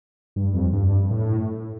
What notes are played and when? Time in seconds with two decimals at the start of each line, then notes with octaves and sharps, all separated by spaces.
0.36 G2
0.54 F2
0.73 G2
1.11 A2